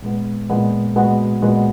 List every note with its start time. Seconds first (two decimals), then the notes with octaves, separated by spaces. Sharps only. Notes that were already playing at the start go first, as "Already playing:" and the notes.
0.02 A#2 G#3 B3
0.49 A#2 G#3 B3
0.96 A#2 G#3 B3 F#4
1.42 A#2 G#3 B3 F#4